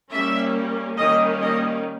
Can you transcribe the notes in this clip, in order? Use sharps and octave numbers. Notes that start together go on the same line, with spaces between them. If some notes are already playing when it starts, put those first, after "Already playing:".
G3 A#3 C#4 E5
D#3 G3 A#3 C#4 D#5
D#5